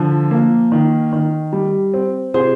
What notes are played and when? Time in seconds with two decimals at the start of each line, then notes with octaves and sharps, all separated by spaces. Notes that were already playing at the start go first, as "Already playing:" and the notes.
Already playing: D3 F3
0.31 A#3
0.72 D#3
1.13 D#3
1.53 G3
1.94 C4
2.34 C3 G#4 C5